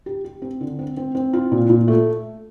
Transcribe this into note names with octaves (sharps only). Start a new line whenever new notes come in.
G4
G4
C4
D3
C4
C4
C4
F4
A#2
A#2
A3